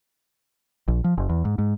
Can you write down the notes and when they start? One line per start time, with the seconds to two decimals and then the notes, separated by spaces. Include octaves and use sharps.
0.88 A#1
1.04 F3
1.17 F#1
1.29 E2
1.45 G#2
1.58 G#2